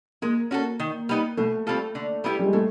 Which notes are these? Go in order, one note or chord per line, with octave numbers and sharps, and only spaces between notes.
G#3 A#3
C#4 F#4 A4
D#3
G3 B3 D#4
B2 A3
G3 C4 F4 A4
D3
G3 B3 E4 G4
G3
G#3
A2 A3